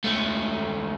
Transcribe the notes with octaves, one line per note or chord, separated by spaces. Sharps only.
C#2 A3